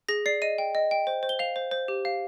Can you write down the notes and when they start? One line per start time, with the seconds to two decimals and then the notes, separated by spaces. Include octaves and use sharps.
0.09 G#4 A#6
0.26 D5 C7
0.42 D#5 D#7
0.58 G5
0.75 D#5
0.91 G5
1.07 C5
1.23 C5
1.29 G7
1.39 F5 F7
1.56 C5
1.71 C5
1.88 G4
2.05 F5